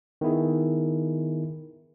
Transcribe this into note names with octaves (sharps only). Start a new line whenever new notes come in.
D#3 B3 E4 G#4